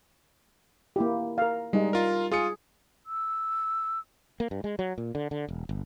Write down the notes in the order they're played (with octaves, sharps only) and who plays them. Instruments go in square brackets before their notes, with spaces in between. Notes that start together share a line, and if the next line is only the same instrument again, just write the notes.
[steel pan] A#3 E4 G4
A#4 F5
[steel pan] G3 D#4 D#5 [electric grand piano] G#3
[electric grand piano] F4 A#4
[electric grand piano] F4 D#6 C#7 [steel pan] G#4
[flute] E6
[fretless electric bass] A#3
G2
G#3
F#3
A#2
D3
D3
E1
G1